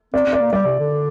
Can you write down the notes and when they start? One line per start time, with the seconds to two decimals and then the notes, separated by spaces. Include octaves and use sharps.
0.14 C4 D5
0.26 C4
0.33 D5
0.40 A#3
0.52 G3 D5
0.65 C3
0.79 D3